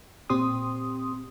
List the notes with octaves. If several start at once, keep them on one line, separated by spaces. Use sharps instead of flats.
A#2 C4 G4 C6 D#6